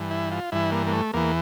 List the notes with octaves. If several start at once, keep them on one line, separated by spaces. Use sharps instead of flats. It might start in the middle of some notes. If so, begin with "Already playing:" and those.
Already playing: G2 E3
E4
F4
G2 E3 E4
A#3
A#3
A3
E2 E3 A#3